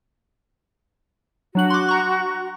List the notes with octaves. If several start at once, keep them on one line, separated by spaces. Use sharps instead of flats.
F#3 D4 F#4 F#7
C6 D6
A#5 C#6